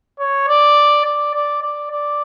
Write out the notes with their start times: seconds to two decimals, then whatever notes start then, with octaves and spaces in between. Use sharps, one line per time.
0.20 C#5
0.48 D5
1.05 D5
1.34 D5
1.63 D5
1.91 D5